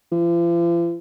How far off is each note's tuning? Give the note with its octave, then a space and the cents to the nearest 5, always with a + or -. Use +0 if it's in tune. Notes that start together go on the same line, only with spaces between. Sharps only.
F3 -45